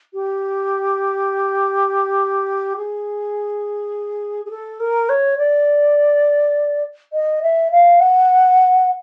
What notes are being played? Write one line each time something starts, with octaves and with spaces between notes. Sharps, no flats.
G4
G#4
G#4
A4
A#4
C#5
D5
D#5
E5
F5
F#5